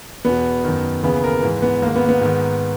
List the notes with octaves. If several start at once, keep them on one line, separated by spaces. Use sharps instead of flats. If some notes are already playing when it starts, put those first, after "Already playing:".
E2 B2 B3
F#2 D#3
D#2 C#3 E3 B3
A#4
G#2 E3
B3
G#2 D#3 A#3
B3
B3
G#2 D#3